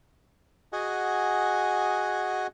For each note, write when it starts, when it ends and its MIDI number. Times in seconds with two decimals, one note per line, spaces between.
0.73 2.47 66
0.73 2.47 68
0.73 2.47 75
0.73 2.47 78
0.73 2.47 80